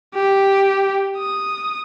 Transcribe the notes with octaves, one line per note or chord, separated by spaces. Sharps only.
G4
D#6